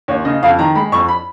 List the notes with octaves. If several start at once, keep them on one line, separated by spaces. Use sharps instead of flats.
D#2 C#5
C#3 D#5
F2 F5
D#3 A#5
G#3 B5
F2 C#6
B5